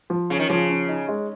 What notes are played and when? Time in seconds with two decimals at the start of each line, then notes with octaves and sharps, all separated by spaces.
0.10 F3
0.30 C#3 C#4
0.39 D#3
0.49 C#3 F3
0.69 C#4
0.89 D#4
1.08 G#3